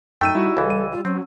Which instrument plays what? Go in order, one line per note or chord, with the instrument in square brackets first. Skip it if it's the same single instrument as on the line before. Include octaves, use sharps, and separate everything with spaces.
[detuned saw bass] F#2 [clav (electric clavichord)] A3 [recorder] D#4 [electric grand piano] G5 E6 D#7
[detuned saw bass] G3 [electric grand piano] E4 F#4
[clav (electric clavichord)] C#2 E3 [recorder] A4
[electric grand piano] D#7
[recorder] F4
[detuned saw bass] F#3 [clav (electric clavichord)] C4 [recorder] C#4